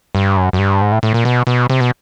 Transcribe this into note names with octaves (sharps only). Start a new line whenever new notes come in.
G2
F#2
F#2
G2
G#2
A2
A2
A#2
B2
B2
C3
B2